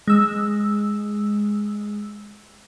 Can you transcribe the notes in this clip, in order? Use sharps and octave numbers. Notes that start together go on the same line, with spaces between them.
G#3 E6